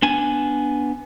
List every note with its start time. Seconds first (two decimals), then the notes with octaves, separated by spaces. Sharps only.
0.02 B3 D4 G#5